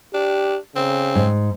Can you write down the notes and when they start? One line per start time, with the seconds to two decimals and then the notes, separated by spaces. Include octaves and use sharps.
0.14 D4 G4
0.76 C#3 C4
1.15 G#2